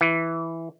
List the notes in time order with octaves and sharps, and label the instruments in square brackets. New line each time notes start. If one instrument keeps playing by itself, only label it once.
[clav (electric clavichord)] E3